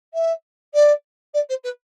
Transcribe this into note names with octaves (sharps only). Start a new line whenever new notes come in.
E5
D5
D5
C5
B4